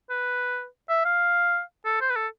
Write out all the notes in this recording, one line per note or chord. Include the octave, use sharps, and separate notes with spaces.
B4
E5
F5
A4
C5
B4
A4